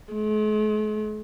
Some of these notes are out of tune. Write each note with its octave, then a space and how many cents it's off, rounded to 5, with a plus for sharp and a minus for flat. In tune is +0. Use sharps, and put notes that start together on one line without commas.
G#3 +45